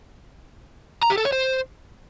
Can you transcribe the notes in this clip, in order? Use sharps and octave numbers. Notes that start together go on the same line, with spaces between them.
A#5
G4
A4
C#5
C5